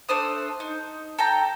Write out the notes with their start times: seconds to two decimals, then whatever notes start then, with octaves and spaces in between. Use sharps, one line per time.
0.09 A3 D4 C5 D#6
0.60 D#4
1.18 A4 G5 A#5